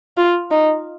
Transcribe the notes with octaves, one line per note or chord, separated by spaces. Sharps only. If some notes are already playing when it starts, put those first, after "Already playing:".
F4
D#4